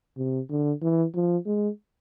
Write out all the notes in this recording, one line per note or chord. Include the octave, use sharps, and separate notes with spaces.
C3
D3
E3
F3
G#3